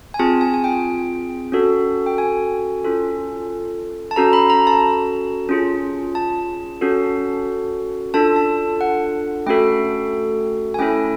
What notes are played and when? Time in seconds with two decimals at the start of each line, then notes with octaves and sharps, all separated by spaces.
0.14 G#5
0.19 C4 F4 G#4 A5
0.41 G#5
0.54 G#5
0.64 G5
1.52 C#4 F#4 A4
2.06 G5
2.18 G#5
2.84 C#4 F4 A4
4.11 A5
4.16 C#4 F#4 A4 A#5
4.33 B5
4.50 A#5
4.67 A5
5.49 C#4 F4 G#4
6.15 A5
6.81 C#4 F#4 A4
8.14 D4 F4 A4 A5
8.36 A5
8.81 F#5
9.46 A3 C#4 F#4 A4 G5
10.74 G#5
10.79 A3 C#4 E4 A4 G5